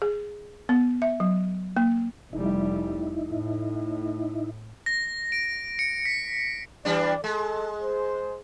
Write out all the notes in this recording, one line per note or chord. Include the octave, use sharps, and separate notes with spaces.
G#4
B3
E5
F#3
A#3
F1 G3 D#4 E4
A2
A#6
D7
C#7
B6
E3 G3 D4 D5
G#3 A4
C5